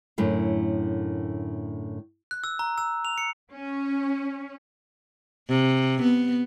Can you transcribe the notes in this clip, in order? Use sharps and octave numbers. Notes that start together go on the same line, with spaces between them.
F#2 A2 D3
F#6
E6
A#5
E6
F7
C#7
C#4
C3
B3